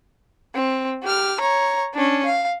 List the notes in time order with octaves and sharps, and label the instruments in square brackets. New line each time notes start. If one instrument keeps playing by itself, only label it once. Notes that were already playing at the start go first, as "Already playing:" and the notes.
[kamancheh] C4
G4 F6
C#5 A#5
C#4 D4
F5